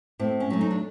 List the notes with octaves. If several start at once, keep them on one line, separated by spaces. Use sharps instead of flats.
A2 C4
C#4
F#3 A3
D#4
D4